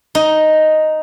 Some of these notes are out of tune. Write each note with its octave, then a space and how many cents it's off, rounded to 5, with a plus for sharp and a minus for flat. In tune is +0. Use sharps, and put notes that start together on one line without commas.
D#4 +0